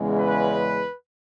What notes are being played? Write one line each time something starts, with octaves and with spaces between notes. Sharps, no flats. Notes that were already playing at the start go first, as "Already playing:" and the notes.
Already playing: E2 C#3 G#3
B4